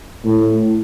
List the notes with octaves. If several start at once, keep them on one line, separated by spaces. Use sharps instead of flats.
A2